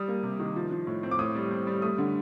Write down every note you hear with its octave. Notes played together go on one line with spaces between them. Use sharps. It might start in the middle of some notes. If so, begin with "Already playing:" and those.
Already playing: G3 D#6
A#3
C3
D#3
F3
F3
A2
C4
D6
A2 D#6
G3
C4
G3
A3 D#6
D3